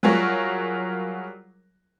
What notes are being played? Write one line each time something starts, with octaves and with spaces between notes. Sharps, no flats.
F#3 G3 F4 G#4 A#4 C#5